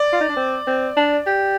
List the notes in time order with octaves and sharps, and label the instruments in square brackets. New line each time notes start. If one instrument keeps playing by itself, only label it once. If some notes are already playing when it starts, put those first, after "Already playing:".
Already playing: [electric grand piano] D5
[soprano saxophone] F4
D#4
D4
C4
C4
D4
G4